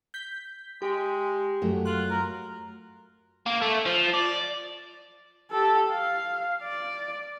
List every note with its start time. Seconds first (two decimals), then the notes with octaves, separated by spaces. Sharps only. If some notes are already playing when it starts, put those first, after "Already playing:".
0.14 G6 B6
0.82 G#3 G4
1.61 F#2 F#3 A3
1.86 F4 F#6
2.10 A#4
3.46 A#3
3.62 A3
3.86 F3
4.14 D5
5.51 G4 A4
5.90 F5
6.63 D5